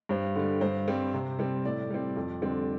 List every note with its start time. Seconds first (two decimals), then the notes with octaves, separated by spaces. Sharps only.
0.09 G2 C5
0.35 D3 G3
0.61 G2 C5
0.88 G3 C4
1.14 C3
1.38 G3 C4
1.65 A2 D5
1.90 G3 C4
2.17 F2
2.42 D3 G3 C4